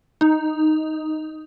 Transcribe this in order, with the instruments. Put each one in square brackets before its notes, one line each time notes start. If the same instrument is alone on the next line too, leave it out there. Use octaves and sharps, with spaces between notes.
[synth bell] D#4